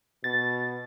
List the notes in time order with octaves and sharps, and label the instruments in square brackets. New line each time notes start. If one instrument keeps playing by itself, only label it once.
[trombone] B2 [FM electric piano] A6